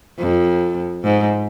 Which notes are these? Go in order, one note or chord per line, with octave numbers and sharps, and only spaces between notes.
F2
G#2